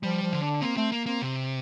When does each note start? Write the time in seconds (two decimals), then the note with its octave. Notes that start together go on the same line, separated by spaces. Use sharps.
0.03 F3 G3
0.23 F3
0.33 D3
0.42 D4
0.61 A#3 C4
0.77 A3 C4
0.92 A#3
1.06 A#3 C4
1.22 C3